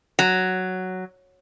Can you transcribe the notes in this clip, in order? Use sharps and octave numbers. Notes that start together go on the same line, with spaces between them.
F#3